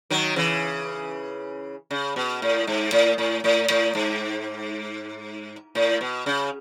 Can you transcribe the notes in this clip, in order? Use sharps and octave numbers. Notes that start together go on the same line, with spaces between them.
D#3 F#3
C#3 E3
C#3
B2
A2
G#2
A2
A2
A2
A2
G#2
A2
B2
C#3